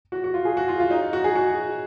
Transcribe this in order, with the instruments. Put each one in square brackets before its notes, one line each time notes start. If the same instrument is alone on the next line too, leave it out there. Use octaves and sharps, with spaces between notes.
[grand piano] F#4
F#4
F4
G#4
F#4
F4
F4
D#4
F#4
G#4
F#4